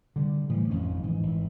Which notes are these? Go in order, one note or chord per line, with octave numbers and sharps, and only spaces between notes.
D3 G3
A2 E3 F3 G3
G#1 F2 G#2 C#4
G#2 E3
G#1 E3